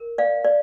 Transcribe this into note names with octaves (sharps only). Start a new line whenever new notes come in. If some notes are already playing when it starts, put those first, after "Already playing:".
Already playing: A#4
D5 F5
D5